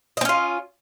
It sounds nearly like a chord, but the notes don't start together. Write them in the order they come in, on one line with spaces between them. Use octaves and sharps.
D#5 C4 C#4 F4